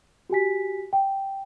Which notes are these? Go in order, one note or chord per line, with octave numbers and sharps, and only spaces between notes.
F#4 G4 G#5 B6
G5